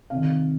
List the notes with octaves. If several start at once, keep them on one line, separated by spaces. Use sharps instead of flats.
C3 D#3 F5